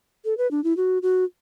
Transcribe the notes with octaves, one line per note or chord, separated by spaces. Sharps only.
A4
B4
D4
E4
F#4
F#4